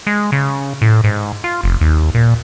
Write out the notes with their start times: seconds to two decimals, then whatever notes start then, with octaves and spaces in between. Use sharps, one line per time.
0.07 G#3
0.32 C#3
0.82 A2
1.04 G#2
1.44 F4
1.63 F1
1.81 D#2
2.14 A#2